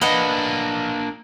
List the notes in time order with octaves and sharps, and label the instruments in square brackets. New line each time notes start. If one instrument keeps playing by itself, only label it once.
[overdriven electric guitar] A#3 D4 [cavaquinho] B4 D#5 F#5